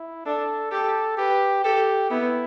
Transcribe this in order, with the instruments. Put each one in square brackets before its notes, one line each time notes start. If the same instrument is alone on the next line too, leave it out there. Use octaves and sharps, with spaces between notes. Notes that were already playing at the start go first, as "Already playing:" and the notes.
Already playing: [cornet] E4
[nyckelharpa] D4 [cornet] A4
[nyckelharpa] G4 [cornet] A4
[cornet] G4 [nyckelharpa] B4
[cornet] G4 [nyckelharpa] A4
[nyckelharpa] B3 [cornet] E4